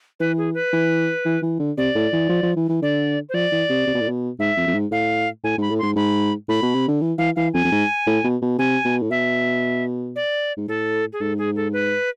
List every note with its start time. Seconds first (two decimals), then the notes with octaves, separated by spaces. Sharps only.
0.20 E3 B4
0.38 G#4
0.54 B4
0.73 E3
1.25 E3
1.42 E3
1.59 D3
1.78 C3 D5
1.95 A2
2.13 E3
2.29 F3
2.43 F3
2.56 E3
2.69 E3
2.82 D3 D5
3.29 C5
3.34 F3 D5
3.52 E3
3.70 C3
3.87 C3
3.94 B2
4.01 A2
4.08 B2
4.39 G#2 E5
4.57 F2
4.67 F2
4.74 G#2
4.91 A2 F5
5.44 A2 G#5
5.58 G#2 B5
5.70 A2
5.79 G#2 C6
5.96 G#2 B5
6.48 A2 B5
6.62 B2
6.74 C3
6.88 D3
7.01 E3
7.18 E3 F5
7.36 E3 F5
7.53 F2 G#5
7.64 F2
7.72 G#2
8.07 A2
8.24 B2
8.42 B2
8.59 C3 G#5
8.85 B2
9.02 A2
9.11 B2 E5
10.16 D5
10.57 G#2
10.68 A2 A4
11.13 G#4
11.21 G#2 A4
11.38 G#4
11.56 A4
11.73 B4